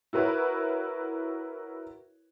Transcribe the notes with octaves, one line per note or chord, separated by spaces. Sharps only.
E4 F#4 A#4 B4 C#5